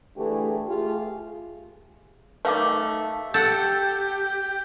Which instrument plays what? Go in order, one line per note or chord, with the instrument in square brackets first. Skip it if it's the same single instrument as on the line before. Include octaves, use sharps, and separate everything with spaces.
[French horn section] D3 E3 A3 G4 G#4
A3 F4 G4 G#4
[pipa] D#3 A3 [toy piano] B4 F5 D6
[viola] G4 G5 [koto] A4 F#5 [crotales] G6